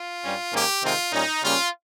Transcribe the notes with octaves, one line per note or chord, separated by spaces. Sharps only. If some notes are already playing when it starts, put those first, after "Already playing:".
Already playing: F4
G2 G3 C#4
G#2 D#3 A#3 C#4 G4
C3 D#3 G#3 C4 F4
A#2 G3 C#4 D#4
C#3 G3 A#3 C#4 F4